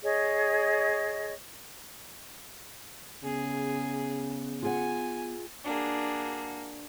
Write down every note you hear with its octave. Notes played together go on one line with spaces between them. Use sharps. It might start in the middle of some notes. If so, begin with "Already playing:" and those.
G#4 C#5 D#5
C#3 B3 G#4
F4 G#4 F#5 G#5
A#3 D4 F#4 G#4